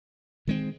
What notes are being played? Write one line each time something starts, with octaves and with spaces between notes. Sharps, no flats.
D#3 G#3 C4